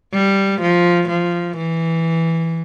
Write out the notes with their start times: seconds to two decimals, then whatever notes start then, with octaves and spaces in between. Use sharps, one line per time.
0.13 G3
0.61 F3
1.09 F3
1.57 E3